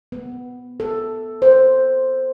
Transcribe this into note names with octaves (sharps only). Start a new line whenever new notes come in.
B3
A4
C5